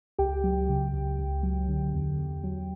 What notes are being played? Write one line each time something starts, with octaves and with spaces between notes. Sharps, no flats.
C#2 G4 G5
F#3
C#3
C#2
C#2
F#3
D3
E2
E2
F#3